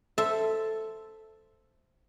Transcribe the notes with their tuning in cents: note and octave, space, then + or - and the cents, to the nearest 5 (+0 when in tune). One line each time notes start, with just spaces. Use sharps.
A4 +0 C5 -5 E5 +0